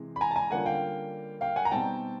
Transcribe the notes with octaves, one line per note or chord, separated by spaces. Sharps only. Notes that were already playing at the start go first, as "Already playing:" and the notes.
Already playing: C3 E3 G#3
B5
G#5 A#5
A5
G#5 A#5
D3 G3 A#3 C#4 F4 F#5 G#5
F5 G5
F5 G5
F#5 G#5
A#5
B2 G3 C4 D#4 G5 A5